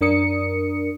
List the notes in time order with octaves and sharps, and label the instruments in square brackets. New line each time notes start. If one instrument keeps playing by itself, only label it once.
[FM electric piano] F#2 D4 A#4 D#6 C#7